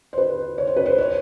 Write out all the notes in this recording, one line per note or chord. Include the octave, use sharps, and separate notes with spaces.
C5
B4
C#5
C5
B4
C5
C#5